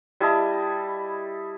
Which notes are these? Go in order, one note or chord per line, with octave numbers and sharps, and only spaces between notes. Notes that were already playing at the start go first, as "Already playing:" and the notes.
G3 E4 D#5 A5